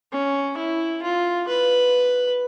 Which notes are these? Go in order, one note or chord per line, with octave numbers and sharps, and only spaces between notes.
C#4
E4
F4
B4